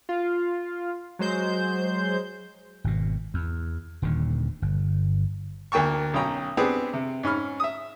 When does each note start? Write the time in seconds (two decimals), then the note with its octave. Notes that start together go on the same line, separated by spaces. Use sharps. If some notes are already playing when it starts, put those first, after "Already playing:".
0.09 F4
1.19 F#3 G#3 C5 G6
2.84 G#1 B2
3.34 E2
4.02 D#1 D#2 A#2 D3
4.62 G1
5.72 D2 A#3 G5 A5 C#6
6.14 B1 C#4 G5 A#5
6.57 B3 C4 D4 G4 G#4
6.93 C3
7.23 G#2 C#4 B5 F6
7.60 E5 D#6